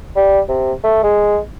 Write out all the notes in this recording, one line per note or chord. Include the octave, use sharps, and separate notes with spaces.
G3
C3
A3
G#3